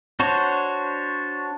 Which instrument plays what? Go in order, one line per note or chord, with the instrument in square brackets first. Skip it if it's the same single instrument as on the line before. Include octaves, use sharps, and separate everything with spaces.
[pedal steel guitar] D4 F#4 C5 C#5